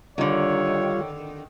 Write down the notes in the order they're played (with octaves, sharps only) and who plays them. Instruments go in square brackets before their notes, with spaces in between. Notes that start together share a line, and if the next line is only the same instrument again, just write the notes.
[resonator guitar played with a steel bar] D3 D#3 [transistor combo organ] G3 F4 [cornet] C#5